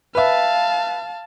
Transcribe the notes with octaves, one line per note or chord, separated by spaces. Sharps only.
B4 E5 F5 A5